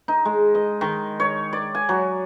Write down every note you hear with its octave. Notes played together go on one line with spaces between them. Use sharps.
D#4
G#3
D#5
D#3
C#5
D5
G#5
F#3